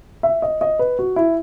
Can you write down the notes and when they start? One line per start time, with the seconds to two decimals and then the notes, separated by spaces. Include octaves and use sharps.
0.23 E5
0.42 D#5
0.61 D#5
0.79 B4
0.99 F#4
1.16 E4